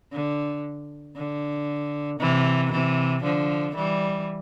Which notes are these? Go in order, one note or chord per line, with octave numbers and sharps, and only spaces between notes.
D3
D3
C3 E3
C3 E3
D3 F3
E3 G3